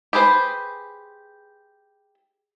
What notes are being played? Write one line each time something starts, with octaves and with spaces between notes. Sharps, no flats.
G4 G#4 B4 C5